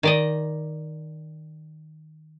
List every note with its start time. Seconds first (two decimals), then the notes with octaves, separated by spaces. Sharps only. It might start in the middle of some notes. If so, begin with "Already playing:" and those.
0.03 D#3 D5 D#5